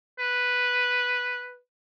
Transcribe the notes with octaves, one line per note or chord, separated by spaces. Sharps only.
B4